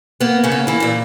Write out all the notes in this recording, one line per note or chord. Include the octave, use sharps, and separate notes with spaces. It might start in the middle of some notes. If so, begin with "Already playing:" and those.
A#3 B3
C#3 C#4
A#3
E3 E4
A#2 E4